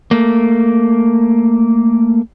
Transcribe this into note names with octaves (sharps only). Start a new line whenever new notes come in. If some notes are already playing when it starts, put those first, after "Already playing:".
A3 A#3